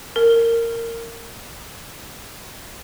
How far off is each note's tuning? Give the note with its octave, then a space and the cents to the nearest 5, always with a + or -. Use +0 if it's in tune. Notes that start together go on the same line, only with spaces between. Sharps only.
A#4 -15